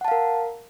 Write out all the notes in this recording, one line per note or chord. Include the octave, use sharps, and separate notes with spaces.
A#4 F5 F#5 A5